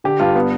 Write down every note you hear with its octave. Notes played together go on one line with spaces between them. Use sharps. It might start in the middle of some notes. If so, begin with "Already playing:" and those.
D3 G4
G2 F4
B3